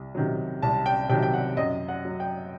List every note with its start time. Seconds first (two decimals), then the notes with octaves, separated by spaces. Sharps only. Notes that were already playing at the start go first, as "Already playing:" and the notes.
Already playing: C2
0.15 C3 D#3 F#3
0.62 C2 A5
0.86 G5
1.09 C3 D#3 F#3 G5
1.23 G5
1.33 F#5
1.57 F#2 D#5
1.88 F#5
2.05 F#3
2.20 G5